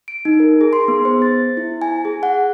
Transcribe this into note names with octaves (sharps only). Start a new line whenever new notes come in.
D7
D#4
A#4
G#4
C6
B3
C5
A6
E4
G#5
G#4
F#5